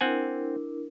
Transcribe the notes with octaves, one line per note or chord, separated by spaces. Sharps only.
C4 D4 E4 A#4 F#5 G#5